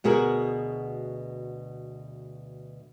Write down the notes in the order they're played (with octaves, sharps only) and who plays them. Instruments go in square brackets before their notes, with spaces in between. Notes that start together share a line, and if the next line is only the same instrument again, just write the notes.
[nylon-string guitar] D2 B2 F#4 G#4 A#4